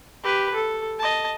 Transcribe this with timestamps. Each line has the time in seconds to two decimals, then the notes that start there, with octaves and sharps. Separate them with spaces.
0.23 G4 B4
0.54 A4
0.99 D#5 A5